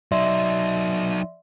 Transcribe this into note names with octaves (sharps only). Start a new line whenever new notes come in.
F#3 D#4 D5 E5 C6